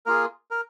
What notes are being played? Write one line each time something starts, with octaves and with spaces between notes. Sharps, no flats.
A#3 F4 G#4 A#4
A#4